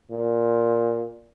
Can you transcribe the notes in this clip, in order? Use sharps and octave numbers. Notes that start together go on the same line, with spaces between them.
A#2